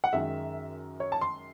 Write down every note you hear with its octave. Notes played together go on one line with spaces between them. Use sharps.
F#5
F#2 D#3 G#3 E5
C#5
A5
C6